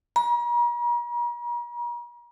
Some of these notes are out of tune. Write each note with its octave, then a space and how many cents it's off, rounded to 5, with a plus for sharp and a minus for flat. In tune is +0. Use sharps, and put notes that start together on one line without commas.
A#5 +45